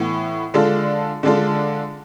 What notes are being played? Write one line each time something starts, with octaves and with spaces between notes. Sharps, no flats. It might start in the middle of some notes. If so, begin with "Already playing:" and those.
Already playing: A2 E3 B3
D3 G#3 D4 F4 A4
D3 G#3 D4 F4 A4